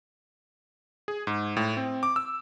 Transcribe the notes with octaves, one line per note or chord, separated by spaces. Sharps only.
G#4
G#2
A2
C4
D6
E6